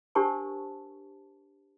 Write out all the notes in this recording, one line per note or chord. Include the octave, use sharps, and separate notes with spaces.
D4 G4 A#4 C5 A5 C#6